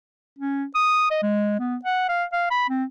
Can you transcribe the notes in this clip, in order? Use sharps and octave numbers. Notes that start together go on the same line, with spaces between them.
C#4
D#6
D#5
G#3
B3
F#5
F5
F5
B5
C4